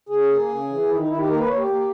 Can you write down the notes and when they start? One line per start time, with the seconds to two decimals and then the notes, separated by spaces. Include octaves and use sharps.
0.09 C#3 G#4
0.29 A#3
0.49 C#3
0.69 E3
0.88 D#3 E4
0.98 D#4
1.08 D#3 E4
1.18 G4
1.28 A#3 A#4
1.38 B4
1.48 A#3 C#5
1.57 G4
1.67 A#3